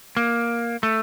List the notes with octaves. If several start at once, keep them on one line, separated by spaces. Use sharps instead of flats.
A#3
A3